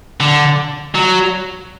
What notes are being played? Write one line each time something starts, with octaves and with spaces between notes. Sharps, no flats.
D3
F#3